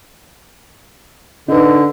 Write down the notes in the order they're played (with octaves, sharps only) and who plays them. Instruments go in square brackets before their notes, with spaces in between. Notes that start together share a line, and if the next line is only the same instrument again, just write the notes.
[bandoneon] D3 [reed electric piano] D#4 B4